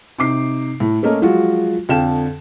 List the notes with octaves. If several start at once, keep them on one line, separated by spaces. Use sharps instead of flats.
C3 D#4 D6 C7
A2
A3 A#3 C#4 A#4 D#5
F3 F#3 G#3 F4 F#4
F2 D3 F5 G5 E7